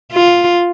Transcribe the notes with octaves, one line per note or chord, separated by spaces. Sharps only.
F4